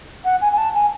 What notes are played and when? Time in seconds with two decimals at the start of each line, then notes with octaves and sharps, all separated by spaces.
0.25 F#5
0.41 G#5
0.52 G#5
0.58 A5
0.74 G#5